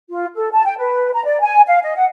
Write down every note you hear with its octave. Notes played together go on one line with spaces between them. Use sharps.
F4
A4
A5
G5
B4
A#5
D5
G#5
F5
D#5
F#5